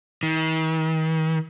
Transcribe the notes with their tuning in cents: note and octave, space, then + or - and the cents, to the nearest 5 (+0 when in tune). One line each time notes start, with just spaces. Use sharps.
D#3 +45